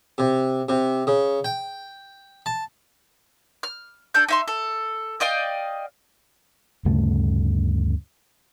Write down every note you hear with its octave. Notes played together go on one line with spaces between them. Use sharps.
C3
C3
C#3
G5
A5
F6
D4 A4 G6
D#4 E5 C6
A4
D5 D#5 F5 G5
D2 G2 C#3 A3